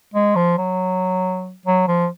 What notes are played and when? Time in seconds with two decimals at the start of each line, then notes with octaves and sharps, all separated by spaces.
0.14 G#3
0.35 F3
0.57 F#3
1.66 F#3
1.88 F3